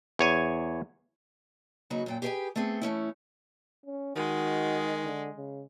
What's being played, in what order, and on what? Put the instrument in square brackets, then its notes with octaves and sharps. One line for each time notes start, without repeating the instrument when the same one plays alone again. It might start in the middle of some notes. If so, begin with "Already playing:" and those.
[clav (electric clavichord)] E2 C#5 G#5
[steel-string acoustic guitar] C#3 F#3 A#3 D#4 F#4 B4
F#2 A#2 G5
G4 G#4 B4 C#5 G5 G#5
A3 B3 C4 G#4
E3 A3 C#4 E4
[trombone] C#4
[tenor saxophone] D#3 [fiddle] G#3 [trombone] F#4
[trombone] D3
C#3